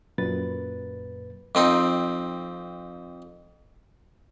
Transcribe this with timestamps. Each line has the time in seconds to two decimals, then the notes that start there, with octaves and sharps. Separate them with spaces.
0.18 F#2 A#2 B4 A6
1.55 F2 C4 D#4